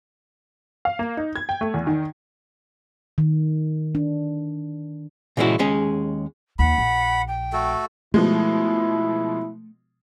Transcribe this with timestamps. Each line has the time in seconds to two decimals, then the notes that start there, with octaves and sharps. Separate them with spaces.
0.85 F5
0.99 A#3
1.17 D#4
1.36 G#6
1.49 G5
1.61 A3
1.74 E2
1.87 D#3
3.18 D#3
3.95 D4
5.37 A#2 C#3 E3 G#3 E4 F#4
5.59 D#2 G#3 C#4 G#4
6.59 D#2 F#5 B5
6.78 A#1
7.27 G5
7.53 A3 F#4 A4
8.14 B2 F3 G#3 A3 E4